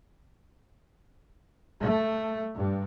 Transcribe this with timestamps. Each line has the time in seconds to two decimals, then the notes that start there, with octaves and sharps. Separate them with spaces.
1.81 A3
2.56 G2